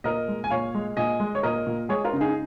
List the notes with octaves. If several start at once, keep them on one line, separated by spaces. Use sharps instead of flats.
A#2 A#4 D#5
G#3
G#5
A#2 C#5 F5
G#3
A#2 D#5 G#5
G#3
C#5
A#2 A#4 D#5
A#2
G#3 G#4 C#5
F4 A#4
C#3
D#4 G#4